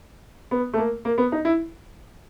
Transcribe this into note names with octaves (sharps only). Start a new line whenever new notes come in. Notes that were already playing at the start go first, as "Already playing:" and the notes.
B3
A3
A#3
A#3
B3
D#4
E4